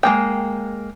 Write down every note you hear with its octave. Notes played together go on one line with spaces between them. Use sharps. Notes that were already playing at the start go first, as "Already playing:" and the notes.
G#3 A#3 G5